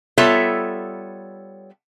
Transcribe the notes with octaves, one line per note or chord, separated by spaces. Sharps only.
G3 B3 F4 A4 C#5 E5